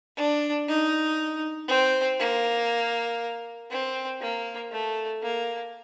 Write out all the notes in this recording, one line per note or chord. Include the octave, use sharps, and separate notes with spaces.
D4
D#4
C4
A#3
C4
A#3
A3
A#3